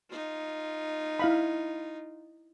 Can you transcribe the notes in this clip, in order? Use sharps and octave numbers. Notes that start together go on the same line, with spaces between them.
D#4 F4
E4 F5 B5